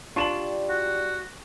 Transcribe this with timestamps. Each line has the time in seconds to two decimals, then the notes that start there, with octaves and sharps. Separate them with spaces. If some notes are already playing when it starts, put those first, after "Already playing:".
0.16 G3 D4 F4 C#6 E7 F#7
0.69 F#4